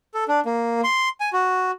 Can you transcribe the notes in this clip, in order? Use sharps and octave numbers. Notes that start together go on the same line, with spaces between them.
A4
D4
A#3
C6
G#5
F#4